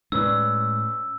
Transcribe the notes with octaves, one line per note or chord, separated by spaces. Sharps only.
A2 G#3 C#4 B4 D5 E6